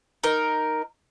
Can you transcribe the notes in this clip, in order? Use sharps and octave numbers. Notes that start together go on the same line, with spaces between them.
D#4 A#4